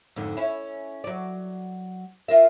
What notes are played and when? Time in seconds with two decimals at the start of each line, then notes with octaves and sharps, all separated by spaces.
0.16 F2 G#2 D3
0.37 C#4 E4
1.04 F#3 D5
2.28 F4 A#4 E5